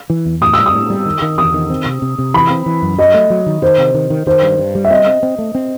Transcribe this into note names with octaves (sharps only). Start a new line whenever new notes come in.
E3
E2
A2 D#6
G3 E6
D#6
A2
G3
D#3
D#3
E2 D#6
D#3
C4
C3
C3
C3
E3 B5
C4
E3
F#2
F#3 D#5
A3
F#3
D#3
D#3 C5
C3
D#3
D#3
D#3 C5
G2
G2
G3
E5
C4 D#5
C4
C4
A3
C4